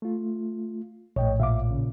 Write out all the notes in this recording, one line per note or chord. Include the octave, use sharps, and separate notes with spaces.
A3 F4
A#1 A2 C#5 D#5 G5
A#2 E5 F5 D6
C#3